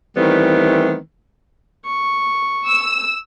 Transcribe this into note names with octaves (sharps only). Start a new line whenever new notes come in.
D#3 E3 G3 A3 B3 C4
C#6
E6